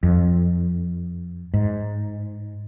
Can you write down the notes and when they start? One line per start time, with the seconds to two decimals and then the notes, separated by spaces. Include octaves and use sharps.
0.03 F2
1.54 G#2